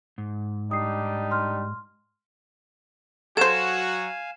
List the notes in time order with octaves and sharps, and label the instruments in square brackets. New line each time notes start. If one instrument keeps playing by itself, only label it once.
[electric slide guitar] G#2
[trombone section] G3 D4 D#4 [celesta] D#6 C7
[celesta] C6 F6
[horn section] F#3 F#4 [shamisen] A4 C5 [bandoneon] F5 G#5 [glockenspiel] G#6 E7